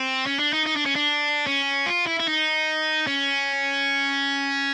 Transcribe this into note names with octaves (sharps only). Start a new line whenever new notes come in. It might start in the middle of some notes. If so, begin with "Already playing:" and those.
Already playing: C4
C#4
D4
D#4
D#4
D4
C#4
D4
C#4
F4
E4
E4
D#4
C#4